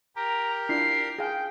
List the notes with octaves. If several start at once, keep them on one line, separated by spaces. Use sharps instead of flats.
G4 A#4 A#5
D4 E4 F4 C7
G#4 F5 G5